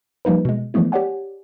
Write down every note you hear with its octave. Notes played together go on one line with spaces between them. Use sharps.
F3 G3 A#3 D#4 B4
B2 G#3
E3 F3 G#3 A3 B3 E4
G4 C#5 D5 F#5 G#5